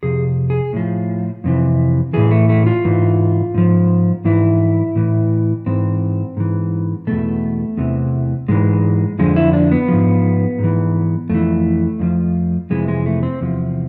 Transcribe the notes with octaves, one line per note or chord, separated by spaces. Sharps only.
F2 C3 G#4
G#4
A2 F3
F2 C3 E3
A2 E3 G#4
A3
A3
F4
G#2 E3
G#2 F3
G#2 E3 E4
A2 E3
G#2 E3 C4
G#2 E3
E2 B2 A3
E2 C3 E3
G#2 E3 G#3
F2 D3 F3 G#3
E4
D4
B3
G#2 F3
G#2
E3
F2 A3
E3
F2 D3 F3
F2 C3 E3 G#3
G#3
A3
C4
E2 C3 F3